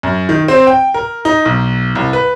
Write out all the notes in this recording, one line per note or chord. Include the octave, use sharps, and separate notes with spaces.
F#2
D#3
C4
G5
A#4
D#4
B1
C2
B4